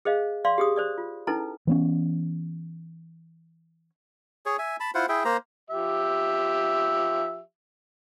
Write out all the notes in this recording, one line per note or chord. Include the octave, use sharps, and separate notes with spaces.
G#4 C5 D#5 F5
D5 F5 C6
G4 G#4 D#6
C5 D5 D#6
F4
C#4 D#4 E4 A4 B4 A#5
E3 B3 C#4
G#4 C#5
E5 G#5
A5 B5
E4 F4 C5 F#5
E4 G#4 E5 G5
A#3 C5 A#5
F3 G4 E5